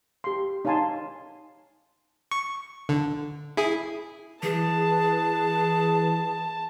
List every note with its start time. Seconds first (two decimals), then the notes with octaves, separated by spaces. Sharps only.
0.24 G4 C6
0.65 D#4 C#5 F5 G#5 A5 C6
2.31 C#6
2.89 D3
3.57 E4 G#4
4.43 E3 G#4 B4 A5